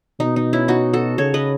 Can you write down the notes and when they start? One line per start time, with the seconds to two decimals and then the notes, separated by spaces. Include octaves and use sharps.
0.20 B2 D#4
0.36 D#4
0.53 C#4 E4
0.68 D#4 F#4
0.93 F#4 A4
1.18 C#3 A4 C#5
1.34 B4 D#5